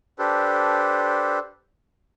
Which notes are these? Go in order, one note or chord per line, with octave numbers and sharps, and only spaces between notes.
D4 G4 A4 B4 C5